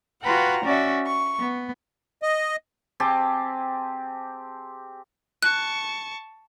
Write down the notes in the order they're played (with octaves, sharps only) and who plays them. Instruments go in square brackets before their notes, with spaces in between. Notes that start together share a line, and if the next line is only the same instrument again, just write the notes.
[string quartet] F4 F#4 B4 F#5 G5 A#5
C#4 F#4 D5 E5
C#6
B3
[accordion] D#5
[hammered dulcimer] C4 G4 G#4 A5
[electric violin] A5 C#6 [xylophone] F#6